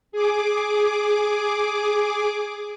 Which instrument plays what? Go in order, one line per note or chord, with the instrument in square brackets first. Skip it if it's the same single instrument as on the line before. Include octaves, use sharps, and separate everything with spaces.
[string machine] G#4 D6